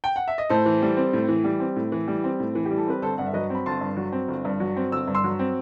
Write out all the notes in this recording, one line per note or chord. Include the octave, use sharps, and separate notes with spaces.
G5
F#5
E5
D#5
A2 A4 C5
E3
G3
C4
A2
E3
G3
C4
A2
E3
G3
C4
A2
E3
G4
G3
A4
C4 B4
G1 A4 C5
G2 F#5
E5
F#3 B4 D#5
C4 B5
G1 A5 C6
G2
F#3
C4
G1
G2
F#3
C4
G1 E6
G2
C6 E6
F#3
C4